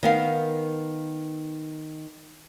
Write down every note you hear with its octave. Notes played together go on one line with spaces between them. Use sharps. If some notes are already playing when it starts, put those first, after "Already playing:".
D#3 B3 F5